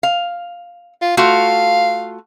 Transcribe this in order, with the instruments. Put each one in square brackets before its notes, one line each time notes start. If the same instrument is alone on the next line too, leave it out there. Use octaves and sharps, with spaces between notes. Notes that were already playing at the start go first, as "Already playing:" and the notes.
[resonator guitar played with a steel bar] F5
[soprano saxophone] F4
[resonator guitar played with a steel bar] A3 F4 F#4 [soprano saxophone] F5